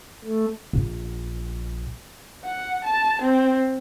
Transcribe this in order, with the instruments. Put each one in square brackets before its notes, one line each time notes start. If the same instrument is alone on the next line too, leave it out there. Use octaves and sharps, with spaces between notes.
[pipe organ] A3
[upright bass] A#1
[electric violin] F#5
A5
C4